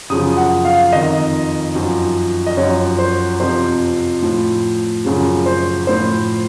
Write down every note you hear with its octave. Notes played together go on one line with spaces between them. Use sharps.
F#2 C#3 F3 D#6
F#5
F5
F2 D#3 D#5
F#2 F3
D#5
F#2 F3 C#5
C5
F2 C3 F3 C5
A2 F3
F#2 C#3 F3
C5
A2 F3 C5